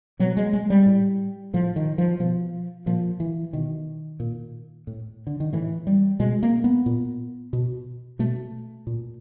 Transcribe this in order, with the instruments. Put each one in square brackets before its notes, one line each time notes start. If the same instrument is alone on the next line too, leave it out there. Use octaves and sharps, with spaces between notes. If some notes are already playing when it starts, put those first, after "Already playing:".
[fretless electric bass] B2 F#3
G#3
G#3
G3
A2
A2 F3
D#3
F3
B2 F3
A#2 F3
E3
B2 D#3
A#2
A2
D3
D#3
A2 E3
G3
B2 G#3
A#3
B3
A#2
B2
B2 A3
A#2